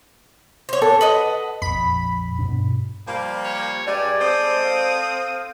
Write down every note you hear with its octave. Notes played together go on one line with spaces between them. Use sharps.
C5 C#5
D4 A4
B4 D#5 F#5
A#1 F2 B5
G2 B2 D4
F3 G3 A#3
C#5
G2 G3 G#3 D5 G#5
C4 A4 C5 D#6
F5